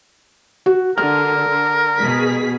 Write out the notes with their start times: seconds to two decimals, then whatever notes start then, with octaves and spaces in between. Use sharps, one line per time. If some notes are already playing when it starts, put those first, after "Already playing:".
0.66 F#4
0.98 D3 A#4 F6
1.48 D3
1.98 B2 G#4 B6